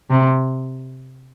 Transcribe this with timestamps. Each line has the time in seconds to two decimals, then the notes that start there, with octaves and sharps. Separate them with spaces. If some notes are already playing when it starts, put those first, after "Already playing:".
0.11 C3